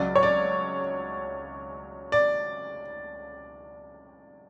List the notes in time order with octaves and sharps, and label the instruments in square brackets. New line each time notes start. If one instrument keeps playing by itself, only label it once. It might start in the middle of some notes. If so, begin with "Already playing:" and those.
Already playing: [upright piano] C#2 C#3 F#3 D5
C#5
D5
D5